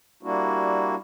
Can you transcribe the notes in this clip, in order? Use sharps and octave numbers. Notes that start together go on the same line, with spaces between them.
G3 A#3 D4 E4 F#4